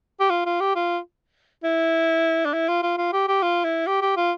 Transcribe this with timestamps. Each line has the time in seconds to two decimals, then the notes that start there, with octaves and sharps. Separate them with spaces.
0.20 G4
0.30 F4
0.46 F4
0.60 G4
0.75 F4
1.63 E4
2.45 D4
2.53 E4
2.68 F4
2.82 F4
2.97 F4
3.13 G4
3.28 G4
3.42 F4
3.64 E4
3.86 G4
4.01 G4
4.16 F4